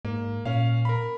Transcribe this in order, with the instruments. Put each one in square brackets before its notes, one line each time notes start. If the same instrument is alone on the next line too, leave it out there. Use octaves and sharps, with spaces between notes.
[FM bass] G#2 [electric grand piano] A#3
[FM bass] A#2 [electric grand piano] C#4 F5
[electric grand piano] A#4 B5